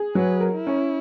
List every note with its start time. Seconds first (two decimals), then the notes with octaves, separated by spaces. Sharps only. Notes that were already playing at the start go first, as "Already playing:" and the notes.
Already playing: G#4
0.15 F#3 B4
0.40 A#4
0.54 E4
0.67 C#4